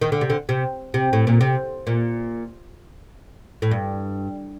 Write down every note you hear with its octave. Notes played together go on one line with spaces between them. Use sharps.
D#3
D3
C3
D3
C3
C3
A2
A#2
C3
A#2
A2
G2